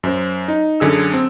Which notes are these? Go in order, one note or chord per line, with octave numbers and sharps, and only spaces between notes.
F#2 C5
D#4
F#2 D3 G#4 E6
C4